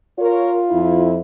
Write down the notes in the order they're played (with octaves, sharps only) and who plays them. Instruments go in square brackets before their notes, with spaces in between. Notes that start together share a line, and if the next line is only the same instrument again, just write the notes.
[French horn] F4 [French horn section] A#4 C#5
[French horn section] F2 E4